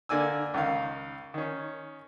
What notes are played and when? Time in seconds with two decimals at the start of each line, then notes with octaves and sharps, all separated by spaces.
0.09 D3 A#3 D5 G#5 E6
0.54 C#2 D#3 F5
1.34 D#3 C#4